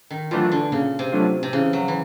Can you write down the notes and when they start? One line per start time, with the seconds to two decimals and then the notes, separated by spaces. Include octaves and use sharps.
0.11 D#3
0.31 E3 F#3 A3 D4 F4
0.52 D3
0.72 A#2 C#3
0.99 C3
1.12 F#3 A3 D4 F4
1.43 C3
1.53 C#3 E3
1.73 F#3
1.88 E3